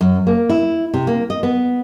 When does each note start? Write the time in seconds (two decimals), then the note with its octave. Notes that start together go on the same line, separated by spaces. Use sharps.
0.01 F#2
0.27 A#3
0.49 E4
0.94 C3
1.07 A#3
1.30 D#5
1.43 B3